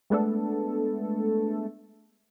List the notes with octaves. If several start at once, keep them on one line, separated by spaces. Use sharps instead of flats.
G#3 A3 B3 D4 A4